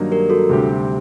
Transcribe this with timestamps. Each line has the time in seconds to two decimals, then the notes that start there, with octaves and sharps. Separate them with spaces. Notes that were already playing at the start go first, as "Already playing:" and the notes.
Already playing: G2 D#3 F#3 A#3 D#4
0.12 G4 A#4
0.30 F#4 A4
0.49 D2 C3 G3 C4 G4